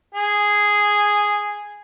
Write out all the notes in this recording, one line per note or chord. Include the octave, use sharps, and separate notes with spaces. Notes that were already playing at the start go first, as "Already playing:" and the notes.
G#4